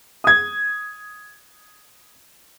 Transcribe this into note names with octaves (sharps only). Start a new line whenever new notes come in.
D#6 G#6